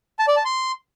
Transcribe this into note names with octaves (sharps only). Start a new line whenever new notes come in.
A5
D5
A5
C6